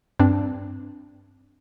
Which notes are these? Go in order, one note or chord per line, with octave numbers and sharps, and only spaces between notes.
G2 C4 D4